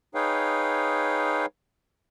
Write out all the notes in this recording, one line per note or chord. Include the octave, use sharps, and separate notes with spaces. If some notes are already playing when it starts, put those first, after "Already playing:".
D#4 G#4 B4 C#5 F5 G5